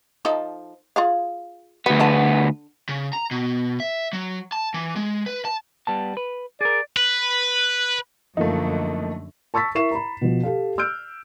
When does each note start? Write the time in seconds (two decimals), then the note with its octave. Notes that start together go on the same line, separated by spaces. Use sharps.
0.25 F3 D#4 A4
0.96 F4 G#4 F5
1.86 D2 B3 F#4
2.00 D3 F#5 A5
2.89 C#3
3.13 A#5
3.31 B2
3.80 E5
4.13 F#3
4.52 A5
4.74 E3
4.96 G#3
5.26 B4
5.45 A5
5.87 G3 B3 A5
6.17 B4
6.61 G#4 A#4 D5
6.96 B4
8.37 F#2 D3 F3 A3 A#3 D#4
9.54 A5 C#6 E6 A6 B6
9.75 E4 A#4 E5 C#6 C7 E7
9.91 A#5 B5
10.21 B2 F3
10.43 G4 A4 F5
10.78 E6 F6 G6 D7